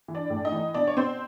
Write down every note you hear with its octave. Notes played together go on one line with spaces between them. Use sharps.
E3
D4 D5
A2
D#4 D#5
E3
B2 D4 D5
C#5
B2 C4 C5